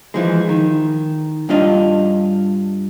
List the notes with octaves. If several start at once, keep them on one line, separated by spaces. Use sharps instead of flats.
E3 F3 G#3
D#3
G2 D4 F4 D#5